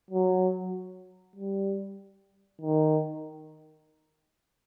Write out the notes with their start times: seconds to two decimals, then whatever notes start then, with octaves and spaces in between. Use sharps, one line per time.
0.11 F#3
1.36 G3
2.61 D#3